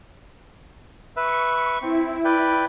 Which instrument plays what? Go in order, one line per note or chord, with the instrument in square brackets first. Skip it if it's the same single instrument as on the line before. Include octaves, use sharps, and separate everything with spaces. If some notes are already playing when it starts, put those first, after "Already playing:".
[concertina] B4 E5 [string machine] C#6
[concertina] C4 [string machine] E4
[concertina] B4 D5 G5